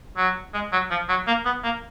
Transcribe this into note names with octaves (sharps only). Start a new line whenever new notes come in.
F#3
G#3
F#3
F3
F#3
A#3
B3
A#3